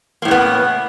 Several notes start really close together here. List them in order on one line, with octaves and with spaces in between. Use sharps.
A#3 A2 C#3 B3